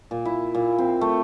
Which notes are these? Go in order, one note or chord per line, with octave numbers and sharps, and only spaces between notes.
A#2
E4
A#2
C4
A3